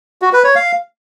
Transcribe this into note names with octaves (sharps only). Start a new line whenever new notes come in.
F#4
B4
C#5
F5